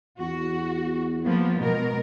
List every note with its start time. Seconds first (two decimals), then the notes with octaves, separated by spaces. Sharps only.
0.20 E2 F#4
1.25 F3 A#3 B3
1.61 B2 G#3 A#4